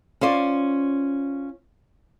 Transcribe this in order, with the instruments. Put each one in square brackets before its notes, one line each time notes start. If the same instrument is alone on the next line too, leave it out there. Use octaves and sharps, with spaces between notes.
[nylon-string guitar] C#4 F4 C5 D5